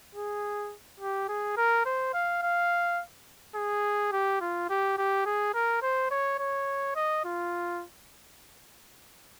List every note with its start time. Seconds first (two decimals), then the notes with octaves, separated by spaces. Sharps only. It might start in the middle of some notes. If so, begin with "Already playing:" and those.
0.15 G#4
1.00 G4
1.29 G#4
1.57 A#4
1.86 C5
2.14 F5
2.43 F5
3.56 G#4
4.13 G4
4.41 F4
4.70 G4
4.98 G4
5.26 G#4
5.54 A#4
5.82 C5
6.11 C#5
6.39 C#5
6.96 D#5
7.25 F4